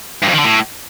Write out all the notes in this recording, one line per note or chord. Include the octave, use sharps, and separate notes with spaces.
G2
F2
D#3
D3
A2